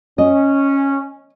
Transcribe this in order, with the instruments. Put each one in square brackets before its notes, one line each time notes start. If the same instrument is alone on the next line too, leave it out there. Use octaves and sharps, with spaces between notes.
[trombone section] C#4 [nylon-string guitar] D#5